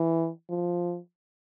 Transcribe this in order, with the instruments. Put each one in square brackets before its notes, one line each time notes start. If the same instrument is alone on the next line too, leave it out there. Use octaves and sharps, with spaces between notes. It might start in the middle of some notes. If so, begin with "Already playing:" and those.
Already playing: [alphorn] E3
F3